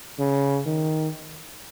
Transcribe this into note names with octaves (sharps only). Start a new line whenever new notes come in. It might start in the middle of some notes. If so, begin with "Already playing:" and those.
C#3
D#3